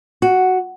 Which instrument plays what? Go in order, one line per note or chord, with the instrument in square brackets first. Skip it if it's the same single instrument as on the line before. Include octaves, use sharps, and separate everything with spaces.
[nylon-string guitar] F#4